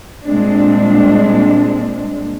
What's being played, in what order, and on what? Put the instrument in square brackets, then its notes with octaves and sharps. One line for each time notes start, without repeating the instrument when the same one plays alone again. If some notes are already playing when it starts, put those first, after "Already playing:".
[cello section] A#2 G3 G#3 C4 D4